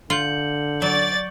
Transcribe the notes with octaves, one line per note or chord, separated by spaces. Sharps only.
D3 F4 G6 C#7 F#7
F#3 D5 C#6 A6